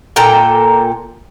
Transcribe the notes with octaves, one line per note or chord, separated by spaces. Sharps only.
A#2 A4 G5 A#5